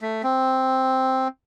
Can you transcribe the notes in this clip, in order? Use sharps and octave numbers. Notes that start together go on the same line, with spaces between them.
A3
C4